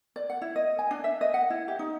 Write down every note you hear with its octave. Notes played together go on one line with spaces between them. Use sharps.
D5
F#5
E4
D#5
G#5
D4
E5
D#5
F#5
E4
G4
D#4